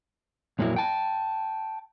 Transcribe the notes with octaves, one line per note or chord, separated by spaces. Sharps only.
F2 A#2 F#3 A#3 E4
G5 A5